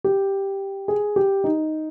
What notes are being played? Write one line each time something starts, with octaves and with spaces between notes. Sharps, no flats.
G4
G#4
G4
D#4